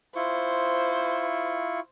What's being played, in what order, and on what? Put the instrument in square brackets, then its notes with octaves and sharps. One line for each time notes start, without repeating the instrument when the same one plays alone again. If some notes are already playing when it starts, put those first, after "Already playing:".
[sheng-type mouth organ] E4 F4 C#6 [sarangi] C5